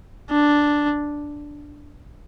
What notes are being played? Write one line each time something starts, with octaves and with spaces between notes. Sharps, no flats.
D4